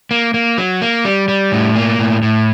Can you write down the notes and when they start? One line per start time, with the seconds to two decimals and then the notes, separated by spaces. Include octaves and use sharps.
0.11 A#3
0.34 A#3
0.58 F#3
0.82 A#3
1.05 G3
1.28 G3
1.52 A2
1.76 A#3
1.99 A2
2.23 A2